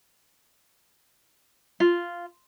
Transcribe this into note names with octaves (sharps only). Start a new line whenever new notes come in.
F4